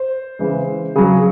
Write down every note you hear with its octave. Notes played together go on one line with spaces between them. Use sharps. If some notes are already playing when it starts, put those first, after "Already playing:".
Already playing: C5
C#3 E3 G#3
C#3 F#3 G#4